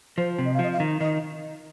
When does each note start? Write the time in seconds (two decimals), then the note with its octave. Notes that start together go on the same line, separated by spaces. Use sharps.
0.17 F3 C5
0.38 C3
0.45 D#5
0.54 F5
0.59 F3 D#5
0.73 F5
0.80 D#3
1.01 D#3 D#5